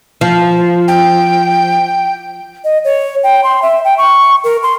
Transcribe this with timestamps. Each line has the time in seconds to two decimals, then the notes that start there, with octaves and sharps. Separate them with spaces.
0.21 F3
0.88 G5
2.64 D#5
2.84 C#5
3.23 G5
3.44 C6
3.62 E5
3.85 G5
3.98 C#6
4.44 A#4
4.63 C6